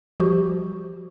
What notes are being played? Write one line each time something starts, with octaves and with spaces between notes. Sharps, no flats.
F3 G3 F#4 G4 C5